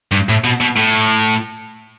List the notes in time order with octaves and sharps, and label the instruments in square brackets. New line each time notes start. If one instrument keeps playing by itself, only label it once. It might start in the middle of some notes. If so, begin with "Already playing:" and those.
[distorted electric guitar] G2
A2
B2
B2
A2